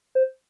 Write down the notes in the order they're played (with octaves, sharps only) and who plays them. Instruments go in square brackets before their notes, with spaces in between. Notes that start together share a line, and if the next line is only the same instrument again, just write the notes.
[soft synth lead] C5